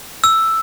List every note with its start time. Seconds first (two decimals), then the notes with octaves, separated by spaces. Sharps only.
0.24 E6